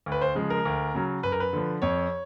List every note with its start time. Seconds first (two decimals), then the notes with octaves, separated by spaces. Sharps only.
0.06 D2
0.12 B4
0.22 C5
0.35 C#3 F3 G#3
0.50 A#4
0.65 D2
0.95 C#3 F#3
1.23 F#2 B4
1.32 A#4
1.40 B4
1.53 D3 F3
1.82 F2 C#5